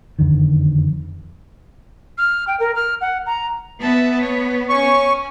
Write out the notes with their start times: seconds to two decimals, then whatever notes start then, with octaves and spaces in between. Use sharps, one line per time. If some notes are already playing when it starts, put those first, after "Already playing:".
0.19 F#1 F2 D3 D#3
2.18 F6
2.48 G5
2.60 A#4
2.75 F6
3.01 F#5
3.26 A#5
3.81 B3 E5 A5
4.20 C#5
4.69 C#4 C#5 G#5 C#6